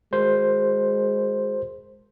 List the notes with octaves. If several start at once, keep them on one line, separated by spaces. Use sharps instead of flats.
G#3 F#4 A#4 C5